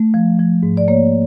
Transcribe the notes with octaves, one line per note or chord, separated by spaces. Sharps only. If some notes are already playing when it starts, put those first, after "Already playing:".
Already playing: A3
F3
F3
G#2
D5
A#3 C#5